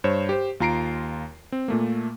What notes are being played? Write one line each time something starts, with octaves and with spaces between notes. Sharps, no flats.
G2 C5 C#5 E7
G4 C5
D#2 F4 A#5 C7 D7
C4
A#2 A3 A#3